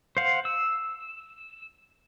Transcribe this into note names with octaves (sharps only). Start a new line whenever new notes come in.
C5 F5 F#5
E6